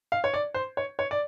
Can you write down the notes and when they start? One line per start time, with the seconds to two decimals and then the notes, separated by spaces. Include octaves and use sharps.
0.12 F5
0.24 C#5
0.34 D5
0.54 C5
0.77 C#5
0.99 C#5
1.11 D5